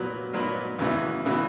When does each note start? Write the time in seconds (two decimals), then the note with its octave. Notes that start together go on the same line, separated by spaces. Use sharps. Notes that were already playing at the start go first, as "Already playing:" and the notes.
Already playing: A#2 F#3 B3 F#4
0.33 A#2 F#3 B3 F#4
0.79 E2 C#3 E3 B3 F#4
1.25 C#3 E3 B3 F#4